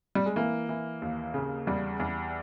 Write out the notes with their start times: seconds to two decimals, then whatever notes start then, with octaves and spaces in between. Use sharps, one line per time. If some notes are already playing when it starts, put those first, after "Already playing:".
0.15 G3
0.26 G#3
0.36 E3 A#3
0.69 E3
1.02 D#2
1.34 C#3
1.67 E2 G3
2.00 E2